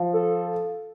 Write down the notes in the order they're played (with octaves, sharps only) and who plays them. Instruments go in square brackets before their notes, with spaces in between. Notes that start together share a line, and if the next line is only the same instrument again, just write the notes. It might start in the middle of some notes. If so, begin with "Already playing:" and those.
Already playing: [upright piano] F3
[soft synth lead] A4